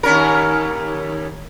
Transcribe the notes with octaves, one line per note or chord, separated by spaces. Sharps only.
D#2 C#4 A#4